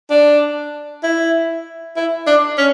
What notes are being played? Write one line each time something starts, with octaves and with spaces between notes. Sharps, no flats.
D4
E4
E4
D4
C#4